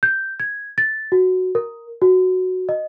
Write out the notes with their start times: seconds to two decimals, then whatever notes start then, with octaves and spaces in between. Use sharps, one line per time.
0.03 G6
0.40 G#6
0.78 A6
1.12 F#4
1.55 A#4
2.02 F#4
2.69 D#5